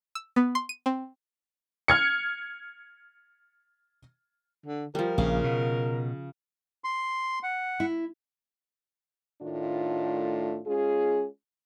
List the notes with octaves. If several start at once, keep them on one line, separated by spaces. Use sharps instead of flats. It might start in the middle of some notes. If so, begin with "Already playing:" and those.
E6
B3
C6
D#7
C4
F6 G#6 C#7
D3
F3 G3 A#4
A#1 C#3 F5
B2
C6
F#5
E4
A2 D#3 A3 D4 F4
G#3 C#4 F4 G#4